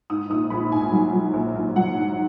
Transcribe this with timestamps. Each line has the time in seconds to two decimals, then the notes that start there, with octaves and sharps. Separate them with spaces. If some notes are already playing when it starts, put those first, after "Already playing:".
0.10 G#2 D#6
0.30 A#1 D#6
0.50 A#1 B5
0.72 G#2 G#5
0.92 F#3
1.13 F#3
1.34 A#1
1.55 A#1
1.76 F#3 F#5
1.97 G#2